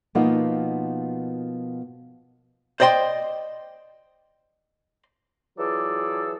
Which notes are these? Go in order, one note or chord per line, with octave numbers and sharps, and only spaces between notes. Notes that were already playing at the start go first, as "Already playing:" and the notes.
B2 F3 A#3 B3 D#4 F4
C5 D5 D#5 G5 C6
E3 F#3 F4 G#4 A4 D5